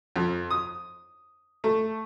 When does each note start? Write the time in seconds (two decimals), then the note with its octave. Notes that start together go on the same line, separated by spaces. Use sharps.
0.16 F2
0.51 D#6
1.64 A3